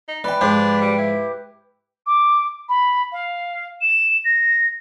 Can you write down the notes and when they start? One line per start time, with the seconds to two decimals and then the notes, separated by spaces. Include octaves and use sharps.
0.08 D#4
0.24 E3 B4 D5 G5
0.41 G#2 F3 D4 F4 G4
0.81 G3
0.98 E4
2.06 D6
2.68 B5
3.12 F5
3.81 E7
4.24 A#6